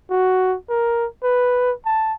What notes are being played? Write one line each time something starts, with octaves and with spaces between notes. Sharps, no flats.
F#4
A#4
B4
A5